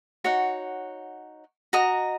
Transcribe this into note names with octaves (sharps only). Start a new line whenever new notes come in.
D#4 F#4 C#5 F#5
F#4 D#5 A#5 D#6